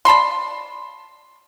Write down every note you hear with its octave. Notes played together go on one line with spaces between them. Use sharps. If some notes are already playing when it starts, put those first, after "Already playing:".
D5 A5 B5 C6